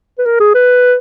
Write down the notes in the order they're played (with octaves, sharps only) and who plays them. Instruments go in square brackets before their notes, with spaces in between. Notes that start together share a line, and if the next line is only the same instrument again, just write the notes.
[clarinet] B4
A#4
G#4
B4